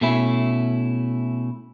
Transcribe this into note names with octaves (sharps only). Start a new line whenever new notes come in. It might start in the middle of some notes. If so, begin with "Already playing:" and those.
B2 A3 C#4 E4